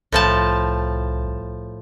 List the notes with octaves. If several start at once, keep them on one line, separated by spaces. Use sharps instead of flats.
C2 A2 F3 A5